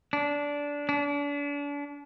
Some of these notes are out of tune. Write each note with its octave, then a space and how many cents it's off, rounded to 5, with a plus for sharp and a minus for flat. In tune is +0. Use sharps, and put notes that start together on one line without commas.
D4 -15
D4 -35